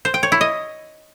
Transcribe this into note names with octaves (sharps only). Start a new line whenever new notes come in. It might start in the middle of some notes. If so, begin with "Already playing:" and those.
C5
G5
C#5
E4
D#5